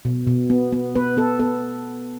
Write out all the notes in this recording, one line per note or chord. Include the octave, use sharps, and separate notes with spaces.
B2
B2
B3
B3
B3 B4
B3 A4
B3 A4